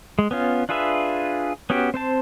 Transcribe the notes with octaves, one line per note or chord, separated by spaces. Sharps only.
G#3
B3 C#4 F4
D4 F4 G#4 B4 E5
B3 C#4 F#4 G4
C4 C5 A5